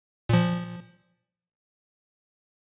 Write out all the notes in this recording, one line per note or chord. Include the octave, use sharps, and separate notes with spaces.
A#2 F3